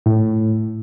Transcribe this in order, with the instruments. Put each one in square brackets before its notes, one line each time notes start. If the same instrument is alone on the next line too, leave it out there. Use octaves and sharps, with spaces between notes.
[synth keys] A2